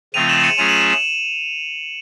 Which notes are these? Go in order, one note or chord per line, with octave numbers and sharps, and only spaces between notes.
C#3 F3 A3 C4 F4 D#7 F7
E7 F#7
C#7 D#7
F#3 A3 C#4 F4 G#4 D#7 F7
E7 F#7
E7 F#7